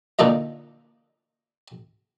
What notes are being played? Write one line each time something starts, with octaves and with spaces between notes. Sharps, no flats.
A#2 D3 D4 D#4 F4 D#5